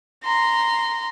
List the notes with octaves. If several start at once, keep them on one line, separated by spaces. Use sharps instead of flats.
A#5 C6